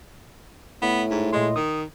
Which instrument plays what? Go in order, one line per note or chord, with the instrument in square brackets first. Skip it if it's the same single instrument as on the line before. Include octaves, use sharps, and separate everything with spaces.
[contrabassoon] A2 [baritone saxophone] B3
[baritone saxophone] G#2
[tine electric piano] A#2 D#5 C6 [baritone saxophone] G#3
[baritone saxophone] D#3 [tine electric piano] D#6